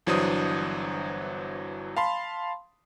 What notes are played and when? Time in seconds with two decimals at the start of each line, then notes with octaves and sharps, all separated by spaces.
0.07 G1 E3 F#3 D4 C5 D#6
1.97 F5 A5 B5 C6